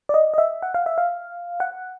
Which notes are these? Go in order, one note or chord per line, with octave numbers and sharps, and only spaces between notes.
D5
D#5
D#5
E5
F#5
F5
E5
F5
F#5